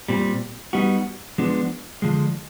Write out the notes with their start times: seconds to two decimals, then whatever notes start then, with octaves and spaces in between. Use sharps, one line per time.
0.08 A#2 G3 C4
0.73 G3 B3 D#4 F#4
1.38 F3 G#3 B3 D4
2.02 D3 F3 G#3